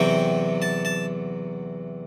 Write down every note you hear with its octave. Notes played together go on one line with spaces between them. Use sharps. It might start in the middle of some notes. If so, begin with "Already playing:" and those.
Already playing: E2 C3 F#3 G5
A5
A5